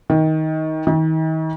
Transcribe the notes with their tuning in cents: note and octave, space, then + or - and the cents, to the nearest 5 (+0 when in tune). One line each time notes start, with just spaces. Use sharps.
D#3 +20
D#3 +40